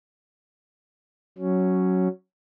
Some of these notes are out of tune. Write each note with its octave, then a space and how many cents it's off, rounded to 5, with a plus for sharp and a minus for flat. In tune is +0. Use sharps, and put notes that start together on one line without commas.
F#3 +0 C#4 +0